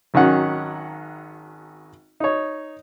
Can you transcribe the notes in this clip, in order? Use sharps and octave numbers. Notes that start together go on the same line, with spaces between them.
G#1 D#3 F#3 C#4 F#5
D#4 C#5